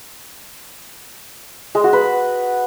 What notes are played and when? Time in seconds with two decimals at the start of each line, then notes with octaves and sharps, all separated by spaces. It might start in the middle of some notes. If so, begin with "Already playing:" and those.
1.75 G#3
1.84 F#4
1.93 B4